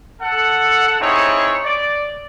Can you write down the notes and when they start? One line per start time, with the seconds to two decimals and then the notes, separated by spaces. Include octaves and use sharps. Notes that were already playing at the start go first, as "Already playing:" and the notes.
0.21 A4 F#5
1.00 C4 D#4 E4 G#4 C#5
1.64 D5